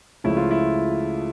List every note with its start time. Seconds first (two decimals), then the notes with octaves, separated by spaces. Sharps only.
0.24 C#2 C#3 F3 A3 E4
0.37 F4
0.51 E4